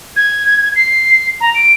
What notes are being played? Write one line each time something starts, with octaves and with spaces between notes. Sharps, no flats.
G#6
C7
A#5
D7